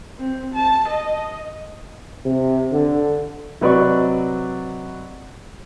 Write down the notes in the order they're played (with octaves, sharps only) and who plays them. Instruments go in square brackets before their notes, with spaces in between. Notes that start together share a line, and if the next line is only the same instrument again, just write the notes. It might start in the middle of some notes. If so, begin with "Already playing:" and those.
[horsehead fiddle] C4
A5
D#5
[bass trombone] C3
D3
[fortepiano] C3 F#3 B4 D5 D#5 C#6